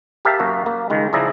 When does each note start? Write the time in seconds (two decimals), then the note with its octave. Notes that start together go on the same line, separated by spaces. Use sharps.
0.25 G4 A#4 E5 F5 A5
0.39 F#2 A#3 F#4
0.66 A#3
0.90 C#2 D#3 G#3
1.13 C#2 F3 E4 G#4 D5 A#5